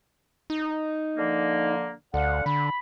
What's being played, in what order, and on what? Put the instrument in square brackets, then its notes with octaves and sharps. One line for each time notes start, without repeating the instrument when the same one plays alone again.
[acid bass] D#4
[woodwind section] D3 F3 A#3
[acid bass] D2 [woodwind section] D3 F5 F#5
[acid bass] D3 [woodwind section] B5